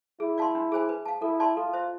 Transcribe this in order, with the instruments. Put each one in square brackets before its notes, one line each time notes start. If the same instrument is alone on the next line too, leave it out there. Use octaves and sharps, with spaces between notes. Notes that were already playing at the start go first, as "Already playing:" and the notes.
[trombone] E4 [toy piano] G#4
[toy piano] D5 F5 A5 C6
D4
G#4 C5 G#5
B4
F5 A5
[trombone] E4 [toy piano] A4
[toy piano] D5 A5 C6
[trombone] F4 [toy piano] A4
[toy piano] C5 E5